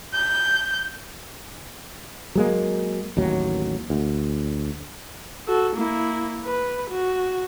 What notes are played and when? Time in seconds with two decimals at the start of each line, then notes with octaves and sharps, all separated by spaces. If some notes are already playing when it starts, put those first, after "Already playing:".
0.14 G6
2.35 F#3 G#3 A#3
3.17 A1 D#2 F#3
3.90 D2
5.47 F#4 A4
5.76 A#3 E4
6.45 B4
6.91 F#4